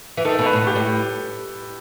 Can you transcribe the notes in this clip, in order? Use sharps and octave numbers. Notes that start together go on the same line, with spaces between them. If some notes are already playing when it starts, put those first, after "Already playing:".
E3
D#3 A4
B2
B4
A2
G4
A2